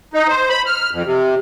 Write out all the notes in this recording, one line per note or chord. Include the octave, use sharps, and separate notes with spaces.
D#4
C5
B5
F6
F2
C3